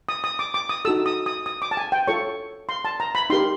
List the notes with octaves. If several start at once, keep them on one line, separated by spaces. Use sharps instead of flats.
D#6
D#6
D6
D6
D#6
D#4 F#4 A4 E6
D#6
D#6
D#6
D6
A5
G#5
G5
F4 A4 C#5 C#6
C6
A5
A#5
B5
D#4 G4 A#4 C6